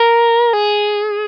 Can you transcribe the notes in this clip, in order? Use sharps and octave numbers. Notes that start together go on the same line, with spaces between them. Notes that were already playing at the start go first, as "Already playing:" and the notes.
Already playing: A#4
G#4